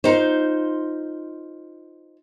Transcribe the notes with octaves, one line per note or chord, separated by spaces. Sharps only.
D#4 F4 C5